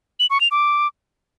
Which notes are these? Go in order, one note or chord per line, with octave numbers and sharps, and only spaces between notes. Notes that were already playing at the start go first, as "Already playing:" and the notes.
F#7
C#6
F7
D6